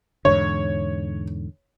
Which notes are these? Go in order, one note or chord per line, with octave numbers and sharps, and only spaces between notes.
E2 G#2 D3 C#5